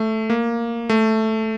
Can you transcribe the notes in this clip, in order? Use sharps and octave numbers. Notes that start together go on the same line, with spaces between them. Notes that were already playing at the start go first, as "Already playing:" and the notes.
Already playing: A3
A#3
A3